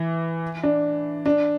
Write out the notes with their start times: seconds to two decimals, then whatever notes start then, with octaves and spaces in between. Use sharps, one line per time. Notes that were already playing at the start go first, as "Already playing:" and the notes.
Already playing: E3
0.63 D4
1.26 D4